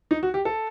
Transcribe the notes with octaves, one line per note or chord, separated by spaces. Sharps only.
D#4
F#4
G4
A4